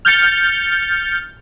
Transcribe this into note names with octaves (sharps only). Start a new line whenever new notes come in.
F6 G6 A6 C#7